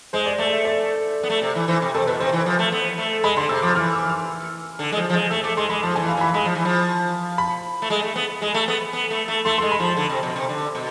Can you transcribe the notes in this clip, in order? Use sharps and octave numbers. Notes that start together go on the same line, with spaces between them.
G#3 C5
D5
A3 D5
E5
D5
B3
A3
C3
E3
E3 C5
C3
C3 A4
B2 B4
C3 C5
E3
F3
A3
B3
A3
G#3 B5
D3 C6
C3 E6
F3 D6
E3 F6
E6
F6
D3
G#3
F3
F3
G#3
A3 E6
A3 D6
G#3 C6
G#3 B5
F3 A5
D3 E3 G#5
F5
E3 B5
G#3 B5
F3
E3
F3
B5
A3
G#3
A3
B3
G#3
A3
B3
B3
A3
A3
A3 C6
G#3 C6
B5
F3 A5
D3
C3
B2
C3
D3
B2